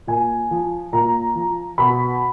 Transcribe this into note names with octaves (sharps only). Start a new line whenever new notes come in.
A#2 G#5
F3
A#2 A#5
F3
B2 B5